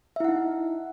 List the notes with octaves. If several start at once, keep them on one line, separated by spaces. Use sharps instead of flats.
D#4 E4 E5 F#5